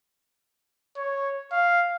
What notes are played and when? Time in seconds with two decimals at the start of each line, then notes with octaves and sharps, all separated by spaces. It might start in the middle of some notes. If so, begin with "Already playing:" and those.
0.97 C#5
1.52 F5